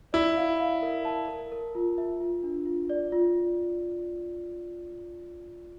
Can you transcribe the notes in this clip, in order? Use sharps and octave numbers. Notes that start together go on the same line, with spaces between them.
E4 D5
F5
F5
A#4
A5
A#4
A#4
F4
E5
F4
D4
F4
D5
F4